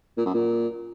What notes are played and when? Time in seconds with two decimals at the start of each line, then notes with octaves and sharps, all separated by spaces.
0.17 A#2
0.26 F#2
0.34 A#2